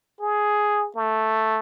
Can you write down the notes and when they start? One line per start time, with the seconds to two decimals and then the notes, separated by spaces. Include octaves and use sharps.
0.20 G#4
0.95 A3